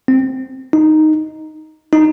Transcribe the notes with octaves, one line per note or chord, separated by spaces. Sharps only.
C4
D#4
D#4